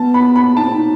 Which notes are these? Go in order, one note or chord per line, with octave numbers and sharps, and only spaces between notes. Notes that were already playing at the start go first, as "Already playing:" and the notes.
Already playing: B3 A5
B5
B5
D#4 A5
C4
D#4